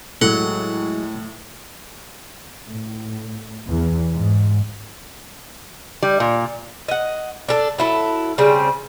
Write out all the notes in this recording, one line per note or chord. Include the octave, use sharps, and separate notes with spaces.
A2 F#3 G#3 A4 F#5
A2
E2
G#2
G3
A#2
D#5 F#5
D4 A4
F#3 E4 A4
C#3 G3 C4